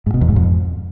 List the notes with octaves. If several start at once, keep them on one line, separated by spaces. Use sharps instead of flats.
G#2
B2
E2
G#2
F2